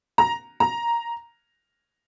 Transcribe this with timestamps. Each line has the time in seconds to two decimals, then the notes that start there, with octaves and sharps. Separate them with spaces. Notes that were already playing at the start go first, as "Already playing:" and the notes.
0.18 A#5
0.60 A#5